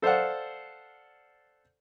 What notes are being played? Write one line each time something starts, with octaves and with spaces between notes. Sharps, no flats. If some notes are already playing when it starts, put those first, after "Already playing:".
A4 C5 D5 F5 F#5